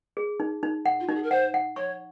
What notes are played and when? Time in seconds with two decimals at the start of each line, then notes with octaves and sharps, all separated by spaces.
0.17 G#4
0.40 D#4
0.63 D#4
0.86 F#5
1.00 F4
1.07 D#4 F#4
1.15 G#4
1.23 A#4
1.31 C5 F#5
1.54 F#5
1.76 C#5 C#6